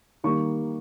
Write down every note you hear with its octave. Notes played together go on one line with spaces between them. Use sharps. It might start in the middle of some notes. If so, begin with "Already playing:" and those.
D#3 G3 A#3 C#6